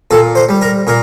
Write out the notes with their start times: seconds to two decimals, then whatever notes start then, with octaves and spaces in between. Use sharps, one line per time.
0.11 A#2 A4
0.35 C5
0.49 G3
0.62 A#4
0.87 A#2 A#4